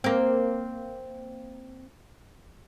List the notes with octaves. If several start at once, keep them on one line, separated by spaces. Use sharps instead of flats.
A#3 C4